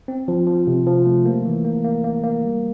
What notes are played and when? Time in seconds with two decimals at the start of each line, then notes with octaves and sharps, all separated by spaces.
0.08 C4
0.28 F3
0.47 F3
0.67 C3
0.87 F3
1.06 A3
1.26 A#3
1.46 E3
1.65 A#3
1.84 A#3
2.04 A#3
2.24 A#3
2.44 G3